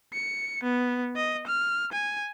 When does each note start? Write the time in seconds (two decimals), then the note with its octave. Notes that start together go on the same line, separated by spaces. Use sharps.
0.13 C#7
0.63 B3
1.16 D#5
1.47 F6
1.92 G#5